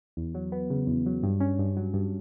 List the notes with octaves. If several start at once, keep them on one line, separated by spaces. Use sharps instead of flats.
E2
F#3
B3
C#3
E2
F#3
G2
C#4
G2
F#3
G2